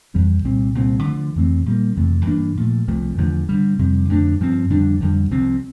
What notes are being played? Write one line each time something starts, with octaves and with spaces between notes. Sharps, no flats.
F2 E3 G3 C4
C2 A#2 G3 C4
C2 A#2 G3 C4
D2 D3 F3 A3
F2 E3 A3 C4
A#2 G3 A#3
F2 C3 E3 A3
G2 E3 A#3 D4
A#2 F3 A3
C2 C3 F3 A3
E2 D3 F3 A3
G2 D3 G3
F2 C3 G3
F2 D3 A3 D4
G2 F3 C4
F2 D3 G3 D4
F2 D3 G3
C2 C3 F3 C4